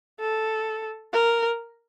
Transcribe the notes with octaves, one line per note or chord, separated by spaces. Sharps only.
A4
A#4